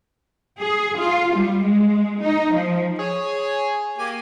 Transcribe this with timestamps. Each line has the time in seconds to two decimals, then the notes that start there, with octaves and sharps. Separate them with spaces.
0.59 G#4
0.99 F4
1.36 G3
1.64 G#3
2.21 D#4
2.54 F3
2.99 G#4 C#5
3.98 A#3 G4 G#5